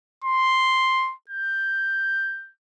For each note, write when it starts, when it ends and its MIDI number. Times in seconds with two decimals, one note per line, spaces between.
0.24 1.14 84
1.29 2.52 91